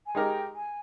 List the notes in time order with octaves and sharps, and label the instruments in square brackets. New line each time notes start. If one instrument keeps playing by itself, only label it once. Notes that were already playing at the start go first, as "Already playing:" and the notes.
[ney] G#5
[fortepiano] G#3 D#4 G4 A#4 [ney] G5
[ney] G#5